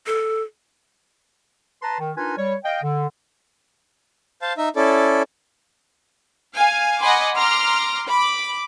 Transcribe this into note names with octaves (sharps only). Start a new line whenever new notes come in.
A4
B4 A5 A#5 C6
D#3
D4 D#4 F4 A#4 B4 G#5
G3 C#5
D#5 F5 G5
D3
C5 F5 A5
D#4 E5
C#4 E4 A4 D5
F5 G#5
D#5 F#5 G#5 B5 C6 D6
A#5 C6 D6 F6
B5 D6